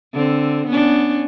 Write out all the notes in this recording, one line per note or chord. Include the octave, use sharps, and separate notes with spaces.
D3 C4
B3 C#4 D4